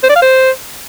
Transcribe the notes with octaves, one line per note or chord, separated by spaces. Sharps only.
C5
D5
F5
C5